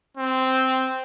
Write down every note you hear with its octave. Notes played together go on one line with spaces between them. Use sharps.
C4